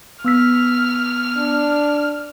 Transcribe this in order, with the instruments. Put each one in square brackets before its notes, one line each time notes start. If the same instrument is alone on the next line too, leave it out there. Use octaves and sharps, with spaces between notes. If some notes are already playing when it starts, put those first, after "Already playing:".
[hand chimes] B3 E6 B6 [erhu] F6
[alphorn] D4